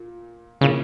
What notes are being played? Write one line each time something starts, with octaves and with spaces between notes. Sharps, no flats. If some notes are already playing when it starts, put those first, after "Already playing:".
Already playing: A#2
A#2 C#3 A#3 E4